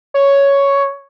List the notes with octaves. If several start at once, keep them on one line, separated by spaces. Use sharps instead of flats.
C#5